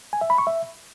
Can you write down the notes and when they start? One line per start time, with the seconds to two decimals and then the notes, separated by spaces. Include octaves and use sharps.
0.13 G#5
0.21 E5
0.30 B5
0.38 C#6
0.47 E5